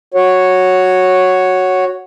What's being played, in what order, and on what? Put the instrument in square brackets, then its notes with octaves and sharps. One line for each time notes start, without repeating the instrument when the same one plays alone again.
[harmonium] F#4 C#5